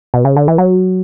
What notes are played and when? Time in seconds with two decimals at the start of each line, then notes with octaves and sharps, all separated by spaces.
0.14 B2
0.25 C#3
0.37 D3
0.48 E3
0.58 F#3